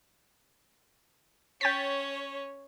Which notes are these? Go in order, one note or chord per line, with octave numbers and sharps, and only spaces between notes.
C#4 C#5 G5 A6 B6